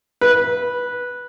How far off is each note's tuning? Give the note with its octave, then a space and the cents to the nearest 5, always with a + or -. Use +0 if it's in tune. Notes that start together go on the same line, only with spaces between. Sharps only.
B4 -10